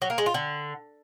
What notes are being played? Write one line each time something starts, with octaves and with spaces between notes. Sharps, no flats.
F#3
A#3
G#3
F4
D3